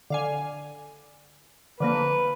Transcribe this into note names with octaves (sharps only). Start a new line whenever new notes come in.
D3 F5 G#5
D3 F3 A#3 B4